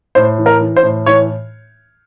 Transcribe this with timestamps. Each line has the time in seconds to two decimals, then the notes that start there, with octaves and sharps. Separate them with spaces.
0.15 A2 C5
0.38 E3
0.46 A#4
0.61 E3
0.77 C5
0.83 A2
1.06 E3 C#5